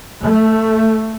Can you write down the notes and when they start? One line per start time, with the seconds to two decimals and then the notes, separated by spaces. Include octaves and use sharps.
0.24 A3